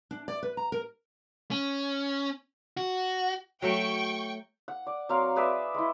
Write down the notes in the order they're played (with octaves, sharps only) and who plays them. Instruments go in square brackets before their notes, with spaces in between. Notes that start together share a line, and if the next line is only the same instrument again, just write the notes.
[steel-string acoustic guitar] D4
D5
B4
A#5
A#4
[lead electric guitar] C#4
F#4
[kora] F#3 A3 [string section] G5 C#6
[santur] F#5
D5
F#3 C4 A#4 F5
G#4 B4 D5 E5
G#3 E4